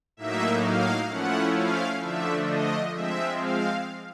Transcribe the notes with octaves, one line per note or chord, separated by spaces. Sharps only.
A2 F#3 A#3 D#4 E5
F5
F3 A3 C#4 E4 F#5
F5
D3 F3 A3 D4 E5
D#5
F3 G#3 C4 E5
F5